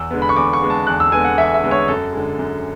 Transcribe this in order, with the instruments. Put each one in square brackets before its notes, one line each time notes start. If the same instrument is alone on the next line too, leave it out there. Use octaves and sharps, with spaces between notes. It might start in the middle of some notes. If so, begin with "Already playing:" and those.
Already playing: [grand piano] E2 E6
D3 G#3 B3
B5
C#6
E2 D6
C#6
D3 G#3 B3
A5
E2 F#6
E6
D3 G#3 B3 G#5
F#5
E2 E5
E5
D3 G#3 B3
C#5
F#2 A4
D3 G#3
F#2